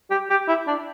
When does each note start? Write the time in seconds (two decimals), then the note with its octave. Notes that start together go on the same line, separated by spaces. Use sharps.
0.11 G4
0.30 G4
0.48 E4
0.67 D4